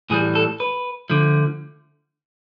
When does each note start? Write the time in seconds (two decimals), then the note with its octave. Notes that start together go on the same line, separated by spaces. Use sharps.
0.10 A2 E3 G3 G#4
0.35 A4
0.60 B4
1.10 D3 F3 A3